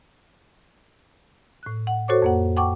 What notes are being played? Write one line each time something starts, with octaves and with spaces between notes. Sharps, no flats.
A2 F#6
F#5
F#4 A4 C5 C#5 C#6 D6
F2 A#3 F#5
F#5 G5 A5 C#6 D6